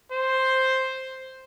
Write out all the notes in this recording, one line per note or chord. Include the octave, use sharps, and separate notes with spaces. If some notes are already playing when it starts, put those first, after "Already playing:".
C5